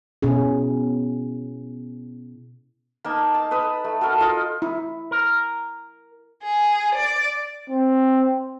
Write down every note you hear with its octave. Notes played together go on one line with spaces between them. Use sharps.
B2 B3 C#4 E4 G#4
A#3 D#4 A5
A5
B4 B5 D#6
A3
F#4 A4 A#4
F4 D#5
E4
A#4
G#4
D5
C4